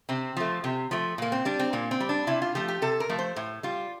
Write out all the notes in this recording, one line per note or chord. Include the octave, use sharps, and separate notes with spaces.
C3 C4
F3 A3
C3
F3 A3
A#2 A#3
C4
G3 D4
C4
A#2 A#3
C4
G3
D4
C3 E4
F4
F3 A3 G4
G4
C3 A4
A#4
F3 A3
C5
A2
G3 F4